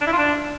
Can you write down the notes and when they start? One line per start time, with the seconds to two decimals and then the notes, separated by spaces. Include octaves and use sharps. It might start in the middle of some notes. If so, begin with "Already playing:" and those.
0.01 D4
0.07 E4
0.13 F4
0.18 D4